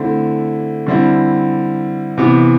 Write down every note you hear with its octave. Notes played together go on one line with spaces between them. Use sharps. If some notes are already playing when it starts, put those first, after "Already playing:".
Already playing: D3 A3 C4 E4
D3 G3 C4 E4
C3 E3 B3